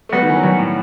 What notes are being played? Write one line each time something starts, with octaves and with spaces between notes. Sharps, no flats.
A3
G3 B3 F#4
D#3
E3
F#3
E3 G3
A2